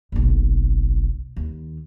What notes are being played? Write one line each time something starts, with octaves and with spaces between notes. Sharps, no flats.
F#1 B1
D#2